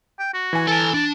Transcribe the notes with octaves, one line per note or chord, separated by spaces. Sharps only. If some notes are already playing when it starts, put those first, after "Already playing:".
G5
F#4
E3 G#5
A4 A5 A#5
D4 A5